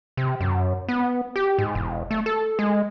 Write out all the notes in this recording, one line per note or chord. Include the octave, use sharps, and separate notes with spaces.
C3
F#2
B3
G4
G#2
E1
A3
A4
G#3